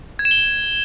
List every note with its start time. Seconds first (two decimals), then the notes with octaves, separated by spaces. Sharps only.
0.19 G#6
0.25 E7
0.31 G7